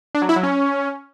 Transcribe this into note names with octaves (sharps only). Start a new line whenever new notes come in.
D4
F#3
E4
F#3
C#4